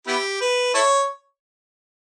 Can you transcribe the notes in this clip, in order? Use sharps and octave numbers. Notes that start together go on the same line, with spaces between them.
B3 E4 G4
B4
E4 A4 C#5